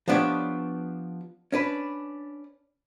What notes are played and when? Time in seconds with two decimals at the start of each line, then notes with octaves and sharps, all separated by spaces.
0.08 F3 B3 D4 G4 C#5
1.52 C#4 D4 B4